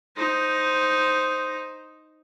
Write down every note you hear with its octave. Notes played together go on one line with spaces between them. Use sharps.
D#4 C5